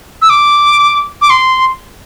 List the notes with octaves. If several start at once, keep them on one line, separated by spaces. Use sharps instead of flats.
E6
D6
D6
C6